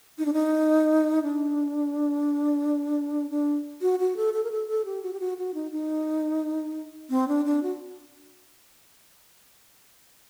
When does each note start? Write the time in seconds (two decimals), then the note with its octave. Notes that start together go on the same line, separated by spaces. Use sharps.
0.18 D#4
0.25 D4
0.33 D#4
1.23 D4
3.30 D4
3.82 F#4
3.99 F#4
4.16 A4
4.34 A4
4.44 A#4
4.51 A4
4.68 A4
4.85 G4
5.03 F#4
5.13 G4
5.20 F#4
5.38 F#4
5.54 D#4
5.72 D#4
7.10 C4
7.28 D4
7.45 D4
7.63 F#4